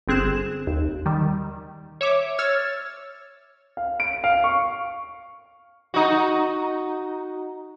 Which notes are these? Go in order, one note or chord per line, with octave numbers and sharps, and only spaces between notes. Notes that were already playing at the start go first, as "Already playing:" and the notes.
G1 C4 G#4 F#6 E7
D#2
D#3 G3
C#5 E5 D6
C#5 E6 F6 G#6 A6
F5
D7
F5
C#6
D#4 F#4